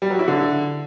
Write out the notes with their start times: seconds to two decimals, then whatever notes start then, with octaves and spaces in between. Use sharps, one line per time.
0.02 G3
0.10 F#3
0.19 E4
0.28 D3